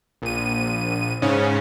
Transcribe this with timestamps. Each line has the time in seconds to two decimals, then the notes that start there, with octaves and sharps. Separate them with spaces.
0.22 A#1 D#7
1.22 G#2 C#3 C#4